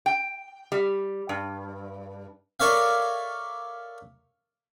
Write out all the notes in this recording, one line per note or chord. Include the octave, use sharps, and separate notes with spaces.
G5
G3
G2
A4 A#4 C#5 D5 E5 F5